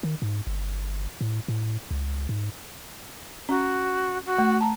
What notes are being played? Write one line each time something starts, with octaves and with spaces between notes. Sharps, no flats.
D#3
G#2
G1
A2
A2
C#2
G#2
C#4 F#4
F#4
A3
A5 A#5